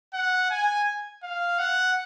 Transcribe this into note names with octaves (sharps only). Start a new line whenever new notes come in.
F#5
G#5
F5
F#5